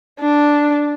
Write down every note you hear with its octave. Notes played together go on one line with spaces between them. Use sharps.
D4